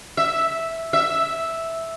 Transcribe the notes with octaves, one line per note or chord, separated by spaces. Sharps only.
E5
E5